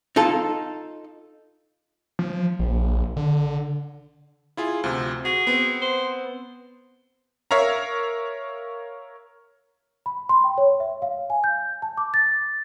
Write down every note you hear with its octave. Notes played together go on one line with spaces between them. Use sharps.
D#4 F4 A4
F3
A#1
D3
E4 F4 G#4
D2 C3 F3
F#4 G#4
B3 C4
C5
A#4 C#5 E5 F5 A#5
B5
C6
G5
C#5
E5
F5
G#5
G6
A5
D6
A6